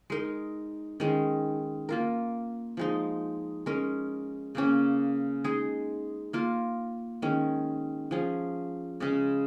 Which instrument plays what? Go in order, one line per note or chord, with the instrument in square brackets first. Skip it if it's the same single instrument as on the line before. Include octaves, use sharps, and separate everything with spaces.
[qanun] G#3 D#4 A#4
D#3 G#3 C#4
A#3 F4 A#4
F3 G#3 D#4
G#3 C#4 A#4
C#3 A#3 C#4
G#3 D#4 G#4
A#3 F4 A#4
D#3 G#3 C#4
F3 C#4 G#4
C#3 G#3 C#4 G#4